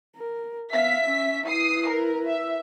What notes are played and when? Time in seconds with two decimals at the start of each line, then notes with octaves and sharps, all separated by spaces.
0.16 A#4
0.72 B3 E5 F5 B6
1.02 C#4
1.47 E4 B4 D#6 C7
1.87 A#4
2.27 E5